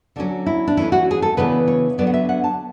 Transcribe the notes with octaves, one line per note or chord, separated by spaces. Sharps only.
D3 F#3 C#4 D4
E4
D4
E3 A3 C#4 E4
F#4
G#4
A4
C#3 E3 B3 D4 B4
C#5
D3 F#3 B3 D4 D5
F#5
E5
F#5
A5